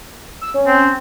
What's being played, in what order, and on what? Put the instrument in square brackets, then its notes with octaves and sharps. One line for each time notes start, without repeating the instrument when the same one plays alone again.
[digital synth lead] E6
C#4
[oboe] C4